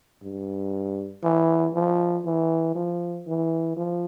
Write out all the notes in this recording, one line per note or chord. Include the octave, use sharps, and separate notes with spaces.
G2
E3
F3
E3
F3
E3
F3